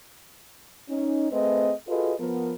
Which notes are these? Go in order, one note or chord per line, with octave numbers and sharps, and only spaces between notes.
C#4 D#4
A3 C4 G#4 B4 D#5
F4 F#4 G#4 A4 B4 D#5
F3 B3 A#4